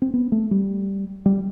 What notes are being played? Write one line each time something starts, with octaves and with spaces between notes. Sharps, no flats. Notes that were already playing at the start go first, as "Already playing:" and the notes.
C4
B3
A3
G3
G3